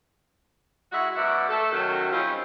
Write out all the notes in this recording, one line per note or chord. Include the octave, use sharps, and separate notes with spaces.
G#3 E4 F#4
F#2 B2 D5 E5 F#5
A3 A4
C3 D#3 F#3 C#4 F#4
G3 C4 C#4 D#4 F4